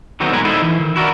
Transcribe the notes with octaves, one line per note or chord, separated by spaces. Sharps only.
D3 D#3 F#3 B3 C4 D#4
B1 A#2 G#3 A#4 B4 G#5
D#4 E4 A4 C5
E3
D#3
E4 F#4 A#4 D5